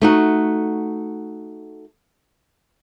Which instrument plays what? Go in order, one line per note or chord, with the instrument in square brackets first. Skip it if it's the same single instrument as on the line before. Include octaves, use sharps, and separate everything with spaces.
[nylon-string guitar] A3 D#4 F#4